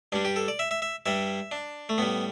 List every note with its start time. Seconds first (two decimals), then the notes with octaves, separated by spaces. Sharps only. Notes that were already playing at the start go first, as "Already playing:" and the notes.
0.12 G2 G3 D4
0.25 G4
0.36 A4
0.48 D5
0.59 E5
0.71 E5
0.82 E5
1.06 G2 G3 E5
1.51 D4
1.89 A3
1.98 A2 G3 B3